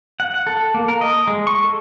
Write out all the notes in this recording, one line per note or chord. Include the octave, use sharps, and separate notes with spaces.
F#5
F#5
A4
A#3
A#4
D#5
G#3
C#6
A4